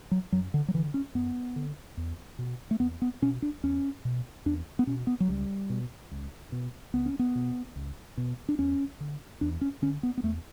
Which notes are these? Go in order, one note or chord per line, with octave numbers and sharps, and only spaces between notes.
F#3
F#2 F#3
D3
F#3
D3 E3
C#4
F#2 B3
D3
E2
B2
A3
E2 B3
B3
B2 C#4
D4
E2 C#4
B2
E2 D4
B3
B2 C#4
B3
F#3
C#2 G3
B2
C#2
B2
C#2 B3
C#4
B3
B2
C#2
B2
D4
E2 C#4
D3
E2 D4
C#4
D3 C#4
B3
B3
E2 A3